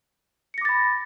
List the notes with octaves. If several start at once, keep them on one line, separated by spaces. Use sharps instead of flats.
B5 D6 A6 A#6 C#7